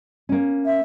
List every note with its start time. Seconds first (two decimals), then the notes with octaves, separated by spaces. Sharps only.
0.29 A#3 C#4
0.66 E5